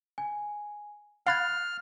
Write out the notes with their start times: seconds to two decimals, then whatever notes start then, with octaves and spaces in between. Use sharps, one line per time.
0.18 G#5
1.27 F5 B5 F6 F#6 G#6 A6 C7